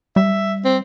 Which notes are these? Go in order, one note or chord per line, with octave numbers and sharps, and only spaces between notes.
G3 E5
C4